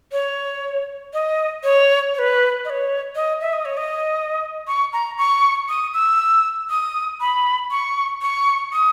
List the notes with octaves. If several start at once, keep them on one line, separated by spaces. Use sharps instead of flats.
C#5
D#5
C#5
C#5
B4
D#5
C#5
D#5
E5
D#5
C#5
D#5
C#6
A#5
C#6
D#6
E6
D#6
B5
C#6
C#6
D#6